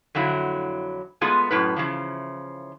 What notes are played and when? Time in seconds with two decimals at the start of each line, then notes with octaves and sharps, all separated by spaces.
0.15 F2 D3 F#3 E4
1.21 G#3 A3 B3 F4 G#4
1.51 F#2 A2 B4
1.76 C#3 E3 F3